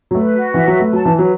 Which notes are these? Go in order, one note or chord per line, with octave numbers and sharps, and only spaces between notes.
F#3
A3 B4
F#4
E3 E5
F#3
B4
A3
F#3 A5
E3
B4
F#3